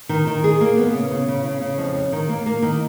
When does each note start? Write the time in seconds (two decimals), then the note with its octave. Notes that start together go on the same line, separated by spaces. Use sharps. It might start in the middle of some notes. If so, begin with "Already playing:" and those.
0.09 D#3
0.27 D#3
0.44 G#4
0.61 A#3
0.77 B3
0.94 C#3
1.11 C#3
1.28 C#3
1.45 C#3
1.61 C#3
1.78 F2
1.95 C#4
2.12 D#3
2.29 A#3
2.46 A#3
2.62 D#3